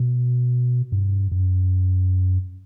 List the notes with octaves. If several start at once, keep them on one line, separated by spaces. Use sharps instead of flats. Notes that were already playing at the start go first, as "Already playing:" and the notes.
Already playing: B2
G2
F#2